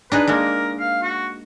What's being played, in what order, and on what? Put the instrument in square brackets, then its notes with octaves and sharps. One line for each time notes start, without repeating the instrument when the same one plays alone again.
[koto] D4 D#4 G#4 [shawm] B4
[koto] G#3 A#3 [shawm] A#4
[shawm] F5
F#4